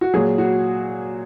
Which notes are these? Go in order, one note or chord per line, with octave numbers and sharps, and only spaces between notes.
F#4
A#2 F#3 G#4
F#4